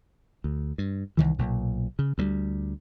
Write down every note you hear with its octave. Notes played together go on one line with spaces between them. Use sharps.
D2
G2
C2 C3 D#3 E3
B1 A#2
C#3
D2 F#3 G3